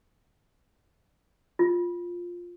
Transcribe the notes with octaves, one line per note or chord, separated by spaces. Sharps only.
F4